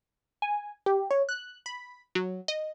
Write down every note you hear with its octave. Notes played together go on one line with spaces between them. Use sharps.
G#5
G4
C#5
F#6
B5
F#3
D#5